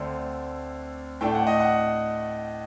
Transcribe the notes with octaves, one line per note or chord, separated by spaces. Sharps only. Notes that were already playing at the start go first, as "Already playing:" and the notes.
Already playing: D2 D3 A3 C4 D5
A2 A3 D4 G5
F#5
D#5
F#5